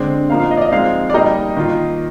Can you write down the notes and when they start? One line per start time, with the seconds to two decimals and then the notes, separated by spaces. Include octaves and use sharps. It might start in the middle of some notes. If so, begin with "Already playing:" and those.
Already playing: D3 G#3 C4 D5
0.30 F3 A#3 D#4 F5
0.40 F5
0.51 D#5
0.57 D5
0.61 D#5
0.71 F3 G#3 C4 D#4 F5
1.10 D5
1.14 G3 A#3 D#4 D#5
1.57 D#3 A#3 F4